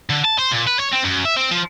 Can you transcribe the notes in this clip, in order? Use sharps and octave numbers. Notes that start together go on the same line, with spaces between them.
D3
A5
C5
A#2
B4
C#5
C4
F#2
E5
C4
F3